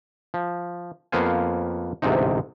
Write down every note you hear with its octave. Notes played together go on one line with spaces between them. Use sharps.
F3
F2 A#3 B3 C5 F5 G#5
A1 D2 G#2 C3 D#4